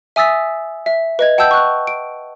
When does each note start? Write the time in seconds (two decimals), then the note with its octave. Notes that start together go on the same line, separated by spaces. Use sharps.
0.16 E5 G#5 D#6 E6 A6 B6
0.86 E5
1.19 B4 D#5 G#6
1.38 F#5 G5 A5 E6 G6
1.51 C#6 F#6
1.87 D7